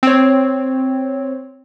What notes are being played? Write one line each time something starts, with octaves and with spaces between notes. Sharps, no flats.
C4 C#5